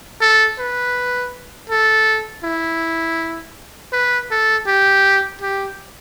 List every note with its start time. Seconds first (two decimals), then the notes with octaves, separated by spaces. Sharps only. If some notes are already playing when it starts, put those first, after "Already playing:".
0.21 A4
0.59 B4
1.70 A4
2.44 E4
3.93 B4
4.31 A4
4.67 G4
5.41 G4